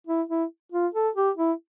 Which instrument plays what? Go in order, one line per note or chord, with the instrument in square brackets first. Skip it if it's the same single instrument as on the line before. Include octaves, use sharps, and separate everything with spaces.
[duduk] E4
E4
F4
A4
G4
E4